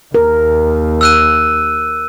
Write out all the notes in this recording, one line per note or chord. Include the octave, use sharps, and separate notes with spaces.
D#2 A#4
E6 F#6 D#7